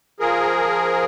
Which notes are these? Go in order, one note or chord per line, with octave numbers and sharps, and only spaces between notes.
F3 G#4 A#4